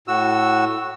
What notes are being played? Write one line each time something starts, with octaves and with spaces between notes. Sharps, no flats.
A2 F#4 E6